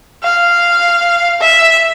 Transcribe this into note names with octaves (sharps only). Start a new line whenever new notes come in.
F5
E5